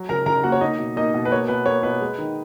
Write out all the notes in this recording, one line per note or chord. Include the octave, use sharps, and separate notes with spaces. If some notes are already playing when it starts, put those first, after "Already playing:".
Already playing: F#3
C#3 A#4 A#5
C#3 A#4 A#5
A#3 F#4 F#5
C#5
A#3 D#4 D#5
B2
A#3 D#4 D#5
B2
B4
A#3 C#5
B2 B4
A#3 C#5
B2 B4
G#3
D#3